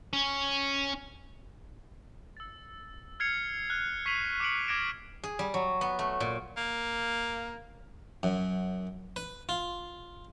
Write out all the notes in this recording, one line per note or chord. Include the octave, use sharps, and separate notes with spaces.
C#4
E6 A6
F6 G#6 C7 C#7 F7
F6 F#6
C#6 B6 C7 D#7 F7 F#7
D6 F#6 C#7 D7 F#7
D6 F6 G#6 A#6 D7 E7
G#4
G3
F#3
B3
A3
A#2
A#3
F#2
B4
F4